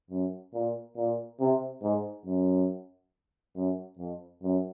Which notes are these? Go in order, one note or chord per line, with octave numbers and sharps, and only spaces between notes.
F#2
A#2
A#2
C3
G#2
F#2
F#2
F2
F#2